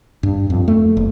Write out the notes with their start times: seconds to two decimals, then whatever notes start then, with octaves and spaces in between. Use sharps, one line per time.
0.23 G2
0.50 F2
0.68 A3
0.97 F#1